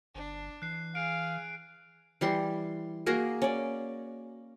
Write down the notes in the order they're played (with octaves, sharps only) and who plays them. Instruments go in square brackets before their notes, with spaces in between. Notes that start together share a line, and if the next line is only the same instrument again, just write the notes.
[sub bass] G1 [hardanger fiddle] D4
[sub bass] E3 [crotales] F#6 C7
[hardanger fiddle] G#4 [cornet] F5 [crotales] D7
[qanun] E3 G3 C6
A#3 F#4 G#4 A#4
C#4 D5